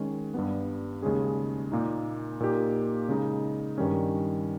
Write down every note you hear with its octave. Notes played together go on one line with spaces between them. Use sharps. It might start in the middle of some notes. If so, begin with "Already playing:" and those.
Already playing: D#3 G#3 C#4
G2 G3 B3
D#2 C#3 G#3 C#4 G#4
A#2 A#3 D#4
A#2 A#3 D#4 G4
C#3 G#3 D#4
G2 D#3 G3 C#4